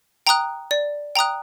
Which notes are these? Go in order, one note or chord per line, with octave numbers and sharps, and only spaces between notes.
G5 A#5 D#6 F#6
D5
G5 A#5 D#6 F#6